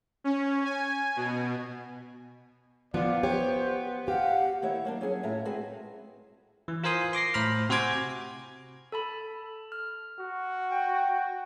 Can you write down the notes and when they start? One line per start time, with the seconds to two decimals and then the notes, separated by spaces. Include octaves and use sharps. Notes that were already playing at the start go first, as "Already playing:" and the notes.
0.24 C#4
0.64 G#5
1.16 B2
2.94 F3 B3 F4 D5
3.23 G4 C5 C#5
4.08 G4 F5 F#5
4.62 D#3 A#3 E4 C#5 E5
4.85 F#3 A#3 D4
5.01 F#3 C#4 G#4 F#5
5.23 A2 C#4 F4 E5 A#5
5.45 G#3 C4 F#4 G#4 B4 G#5
6.68 E3
6.84 F4 A#4 C5 G#5 C6 D#6
7.13 C6 D6 A#6 C7
7.34 A2 C5 A#5 B5 F6
7.69 C3 F#4 C5 G#5 D6 G#6
8.92 A4 A5 B5
9.72 F6
10.20 F#4
10.72 G5